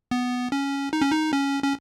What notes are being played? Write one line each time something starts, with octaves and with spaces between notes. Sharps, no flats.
B3
C#4
D#4
C#4
D#4
C#4
C#4